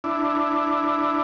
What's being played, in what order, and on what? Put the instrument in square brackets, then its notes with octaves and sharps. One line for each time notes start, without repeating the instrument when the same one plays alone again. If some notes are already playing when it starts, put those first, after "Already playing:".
[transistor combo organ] D4 E4